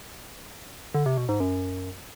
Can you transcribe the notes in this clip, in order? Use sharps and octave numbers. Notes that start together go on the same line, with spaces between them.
D3
C3
B2
G#2
F#2